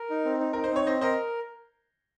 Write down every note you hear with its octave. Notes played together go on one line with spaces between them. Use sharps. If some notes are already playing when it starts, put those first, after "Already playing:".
Already playing: A#4
D#4
C4
D#4
D#4 A#4
C5
C4 C#5
C4 C5 D#5
A#4 C5 D#5